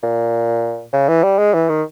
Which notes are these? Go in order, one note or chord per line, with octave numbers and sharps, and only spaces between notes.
A#2
C#3
E3
G3
G#3
E3
D#3